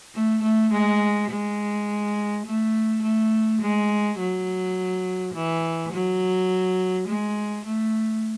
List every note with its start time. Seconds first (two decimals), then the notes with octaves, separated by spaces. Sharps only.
0.14 A3
0.43 A3
0.72 G#3
1.31 G#3
2.46 A3
3.03 A3
3.62 G#3
4.20 F#3
5.34 E3
5.93 F#3
7.08 G#3
7.65 A3